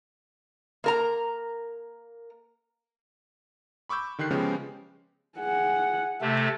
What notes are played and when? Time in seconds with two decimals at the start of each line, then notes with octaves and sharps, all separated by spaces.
0.84 A#3 A#4 A#5
3.89 B5 C#6 D6 E6 G6
4.19 D3 D#3 G4 F#6 C7
4.31 C#3 F3 G#3 B3 C#4 G4
5.38 G#4 F#5
6.22 C3 A3 A4